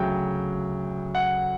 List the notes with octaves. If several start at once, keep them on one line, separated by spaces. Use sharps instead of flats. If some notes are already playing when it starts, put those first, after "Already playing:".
Already playing: D2 C#3 F#3 G5
F#5